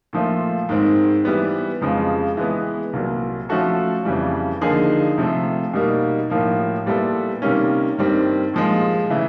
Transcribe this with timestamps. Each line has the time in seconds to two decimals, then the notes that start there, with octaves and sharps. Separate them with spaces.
0.13 A#2 F3 A3
0.69 G#2 D#3 G#3 C4
1.25 E3 G3 B3
1.81 F2 C#3 F3 G#3
2.37 E3 G#3 B3
2.93 C2 A#2 F#3
3.49 F3 A3 C#4 F#4 A4
4.05 F2 C#3 E3 G3
4.62 D3 F3 A#3 D#4 G#4
5.18 C3 F3 A3
5.74 B2 G3 A#3 D#4
6.30 A2 F3 A#3
6.86 A#2 G3 B3 E4 A4
7.42 C3 D#3 G3 A#3 C#4
7.98 G2 D#3 G3 C4
8.54 A#2 F3 G#3
9.10 C#3 E3 A3